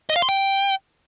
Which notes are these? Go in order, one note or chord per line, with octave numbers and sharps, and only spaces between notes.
D#5
F5
C6
G5